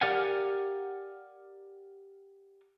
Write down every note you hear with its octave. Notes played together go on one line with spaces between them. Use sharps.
G4 A#4 D5 F5 F#5 G#5